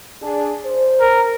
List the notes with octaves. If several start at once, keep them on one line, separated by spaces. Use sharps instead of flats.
D4 G#4
C5
A#4